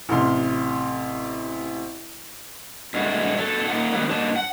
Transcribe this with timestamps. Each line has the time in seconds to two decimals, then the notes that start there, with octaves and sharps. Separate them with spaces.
0.09 A1 C3 C6 F6
2.94 G2 G#3 A3 F#4
3.39 F#3 A4
3.68 A#3 D#4 F4 F#5
3.92 G#2 D#3 F#3 G3 A#3 B3
4.10 G2 F#3 A#3 D#4 A5
4.36 F#5